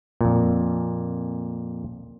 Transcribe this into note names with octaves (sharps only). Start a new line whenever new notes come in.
F2 A#2